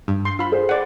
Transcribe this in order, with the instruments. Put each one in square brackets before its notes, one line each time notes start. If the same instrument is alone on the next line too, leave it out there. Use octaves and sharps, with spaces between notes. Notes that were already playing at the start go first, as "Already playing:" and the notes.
[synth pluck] G2
[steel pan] C6
F4 B5
[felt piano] G#4 C5
[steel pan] D5 F#5